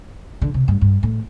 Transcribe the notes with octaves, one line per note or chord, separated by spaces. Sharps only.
D3
C3
G2
G2
A2